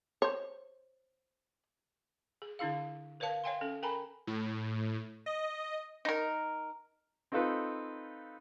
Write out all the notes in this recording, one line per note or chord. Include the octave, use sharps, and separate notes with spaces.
C5 C#5
G#4
D3 D4 E4 G#4 F5
A#4 B4 C#5 F5 A5
C#5 E5 F5 G5 G#5 C6
C#4 A4
A#4 G5 G#5 A#5 B5
A2
D#5
D#4 A#4
C4 D#4 F4 A4 B4